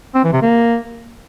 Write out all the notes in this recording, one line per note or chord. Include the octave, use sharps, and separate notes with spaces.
C4
E3
C3
A#3